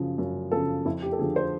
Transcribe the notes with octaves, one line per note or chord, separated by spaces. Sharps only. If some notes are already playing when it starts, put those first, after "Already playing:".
Already playing: F#2 C#3 F3
F#2
C#3 F3 A4
F2 E4
G4
A4
D3 F3 G#4
C5